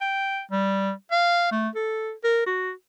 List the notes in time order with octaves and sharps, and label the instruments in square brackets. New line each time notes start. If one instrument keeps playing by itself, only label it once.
[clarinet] G5
G3
F5
A3
A4
A#4
F#4